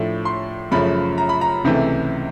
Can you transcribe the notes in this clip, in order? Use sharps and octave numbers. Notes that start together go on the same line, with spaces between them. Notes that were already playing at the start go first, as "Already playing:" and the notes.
Already playing: A2 F3 A3 D4
C6
F#2 C#3 F3 A3 B5
A#5
B5
A#5
C#2 C3 E3 A3